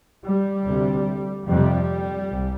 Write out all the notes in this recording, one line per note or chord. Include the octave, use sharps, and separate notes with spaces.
G3
D2 C3
F2 C3 G3
C2